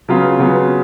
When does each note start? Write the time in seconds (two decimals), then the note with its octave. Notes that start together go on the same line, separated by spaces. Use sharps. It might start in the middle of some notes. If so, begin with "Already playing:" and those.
0.08 C#3 F#3 B3 F4
0.39 C#3 F#3 B3 F4